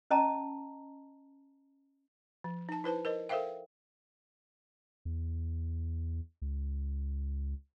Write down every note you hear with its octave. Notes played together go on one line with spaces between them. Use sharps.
C#4 D#5 A5 A#5
F3
D#4 A5
E4 B4 C5 A5
A#4 C5 D#5
A4 A#4 C5 E5 F5 G5
E2
C#2